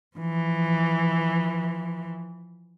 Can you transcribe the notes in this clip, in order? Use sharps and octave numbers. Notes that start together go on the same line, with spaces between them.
E3 F3